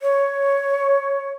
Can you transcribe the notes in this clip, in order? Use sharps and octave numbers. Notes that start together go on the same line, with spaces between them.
C#5